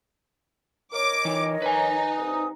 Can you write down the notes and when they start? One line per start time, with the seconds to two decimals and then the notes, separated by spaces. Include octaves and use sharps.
0.93 A#4 C#5 D#5 D6
1.25 E3 D#4
1.62 D#4 B4 G#5
2.17 C2 D#6